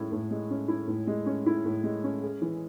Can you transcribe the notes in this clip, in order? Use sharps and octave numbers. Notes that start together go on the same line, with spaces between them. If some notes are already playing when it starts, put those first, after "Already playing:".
Already playing: A2 G#3 C#4 E4
A2
G#3
C#4
E4
A2
G#3
C#4
E4
A2
G#3
C#4
G#4
E3